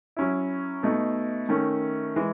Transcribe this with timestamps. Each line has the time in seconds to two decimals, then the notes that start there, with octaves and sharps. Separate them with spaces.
0.17 F#3 C#4 E4
0.83 B2 A3 D#4
1.49 D#3 A3 C#4
2.16 E3 G#3